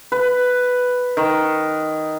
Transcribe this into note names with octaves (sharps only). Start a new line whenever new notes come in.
B4
D#3